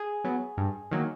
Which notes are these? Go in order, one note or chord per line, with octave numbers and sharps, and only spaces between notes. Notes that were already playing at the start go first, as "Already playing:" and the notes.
Already playing: G#4
F#3 B3
G2
D#3 F#3 A#3